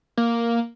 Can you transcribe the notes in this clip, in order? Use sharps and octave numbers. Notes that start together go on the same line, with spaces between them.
A#3